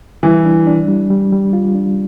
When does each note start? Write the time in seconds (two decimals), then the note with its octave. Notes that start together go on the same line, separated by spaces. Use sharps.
0.23 E3 G3
0.45 D4
0.67 D4
0.88 G3
1.10 G3
1.32 G3
1.53 F4
1.75 D4